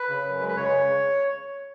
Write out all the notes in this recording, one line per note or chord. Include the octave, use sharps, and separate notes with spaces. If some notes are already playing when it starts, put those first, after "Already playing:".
Already playing: B4
C#3
F#2
G#3
B4
C#3 C#5